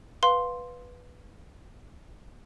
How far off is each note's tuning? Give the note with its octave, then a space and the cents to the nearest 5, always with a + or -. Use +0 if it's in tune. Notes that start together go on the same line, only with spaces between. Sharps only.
B4 +0 F5 +20 C6 +0